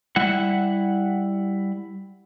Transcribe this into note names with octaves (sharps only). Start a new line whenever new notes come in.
G3 E4 F#5